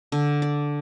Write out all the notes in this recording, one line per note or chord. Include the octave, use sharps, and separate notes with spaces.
D3
D5